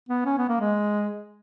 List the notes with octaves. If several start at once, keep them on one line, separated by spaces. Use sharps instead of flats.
B3
C#4
B3
A#3
G#3